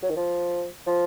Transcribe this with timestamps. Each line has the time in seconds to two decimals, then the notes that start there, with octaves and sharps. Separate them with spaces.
0.02 F#3
0.09 D#3
0.16 F3
0.86 F3